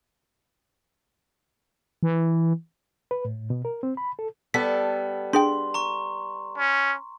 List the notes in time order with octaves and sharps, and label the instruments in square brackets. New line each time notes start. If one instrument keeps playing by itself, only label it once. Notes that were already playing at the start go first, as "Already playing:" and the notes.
[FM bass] E3
[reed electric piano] B4
A2
B2
A#4
C4
B5
A4
[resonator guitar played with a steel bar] G3 B3 A4 [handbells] B6
[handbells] D4 G#4 G5 [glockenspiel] C6
[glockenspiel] A#5 C#6
[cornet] C#4